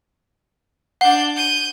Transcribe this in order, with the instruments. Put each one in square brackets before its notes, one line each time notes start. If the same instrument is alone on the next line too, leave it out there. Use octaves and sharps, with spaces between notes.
[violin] D4 G6 [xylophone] F#5
[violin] G6 D#7